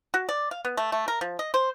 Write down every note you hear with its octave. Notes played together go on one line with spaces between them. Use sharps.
F#4
D5
F5
B3
A3
A3
A#4
F3
D#5
C5